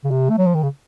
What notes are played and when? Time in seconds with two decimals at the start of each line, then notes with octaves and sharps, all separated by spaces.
0.04 C#3
0.11 C3
0.30 A3
0.38 F#3
0.46 F3
0.55 D#3
0.63 C#3